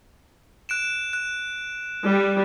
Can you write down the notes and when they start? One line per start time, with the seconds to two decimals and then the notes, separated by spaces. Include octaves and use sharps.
0.69 F#6 D7 E7
1.13 F#6
2.07 G3